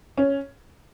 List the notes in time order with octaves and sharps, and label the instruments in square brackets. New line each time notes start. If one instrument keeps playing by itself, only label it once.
[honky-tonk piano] C#4